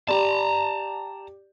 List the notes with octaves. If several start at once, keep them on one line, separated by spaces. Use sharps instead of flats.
G4 D5 A5 A#5